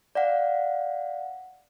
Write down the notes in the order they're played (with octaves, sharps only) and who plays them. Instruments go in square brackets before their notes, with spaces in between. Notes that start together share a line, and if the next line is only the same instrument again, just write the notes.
[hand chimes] D5 F5 F#5